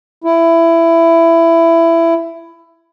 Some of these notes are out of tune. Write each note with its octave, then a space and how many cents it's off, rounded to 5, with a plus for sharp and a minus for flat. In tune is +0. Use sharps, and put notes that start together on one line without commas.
E4 +15